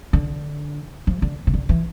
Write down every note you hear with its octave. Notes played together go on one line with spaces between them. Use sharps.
D3
F3
D3
C3
D3
E3